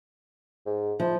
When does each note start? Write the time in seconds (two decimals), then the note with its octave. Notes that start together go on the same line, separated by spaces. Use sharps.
0.66 G#2
1.00 F3 E4